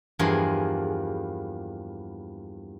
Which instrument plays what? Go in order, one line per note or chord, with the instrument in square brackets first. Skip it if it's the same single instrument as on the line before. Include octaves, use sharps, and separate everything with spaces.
[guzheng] E2 G2 F3 A#3 G#4 C6